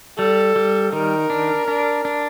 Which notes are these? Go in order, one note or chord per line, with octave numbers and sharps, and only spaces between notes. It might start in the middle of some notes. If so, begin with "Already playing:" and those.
G3 A4
G3
D#3 A#4
D4
D4
D4